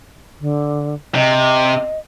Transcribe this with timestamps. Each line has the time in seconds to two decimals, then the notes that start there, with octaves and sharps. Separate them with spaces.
0.41 D3
1.15 C3 D#5